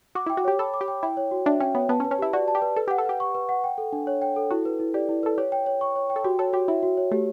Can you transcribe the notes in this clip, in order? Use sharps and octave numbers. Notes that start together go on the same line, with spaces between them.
F#4 D6
E4 G5
F#4
G4 C#5
A4 B5
D6
G4
G5
E4 G5
C#5
F#4
D4 E5
C#4 G5
B3 C#5
B3 A5
C#4
B4
C#4
E4 G4
F#4 D5
A5
G4
B4
A4 B4
G4 F#5
A4
G4 B4
C#6
B4
F#5
G5
A4
D4
C#5
G5
A4
E4 F#4
B4
E4
G4 D5
E4
A4 B4
G4 C#5
G5
C#5
C#6
C#5
G5
A4
F#4 G4
A4 C#5
F#4 G4
E4 E5
F#4
C#5
A3 G4